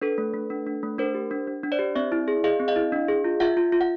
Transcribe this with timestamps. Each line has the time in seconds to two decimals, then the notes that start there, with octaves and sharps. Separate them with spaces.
0.02 D4 A4 B4
0.18 A3
0.34 A3
0.50 D4
0.67 D4
0.83 A3
0.98 D4 A#4 C5
1.15 G4
1.31 D4
1.47 D4
1.63 D4
1.72 C5 D5
1.79 G4
1.96 C4 D5 E5
2.12 E4
2.28 G#4
2.44 G#4 D#5 F5
2.60 C4
2.68 D#5 F5
2.76 E4
2.92 D4
3.08 G#4
3.24 F4
3.40 F4 E5 F#5
3.57 F4
3.72 F4
3.81 F#5